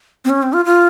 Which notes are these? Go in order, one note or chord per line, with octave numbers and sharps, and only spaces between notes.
C4
C#4
C4
F4
F4